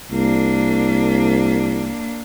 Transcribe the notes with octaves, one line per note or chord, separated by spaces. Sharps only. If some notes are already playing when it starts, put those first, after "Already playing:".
C2 A#3 D4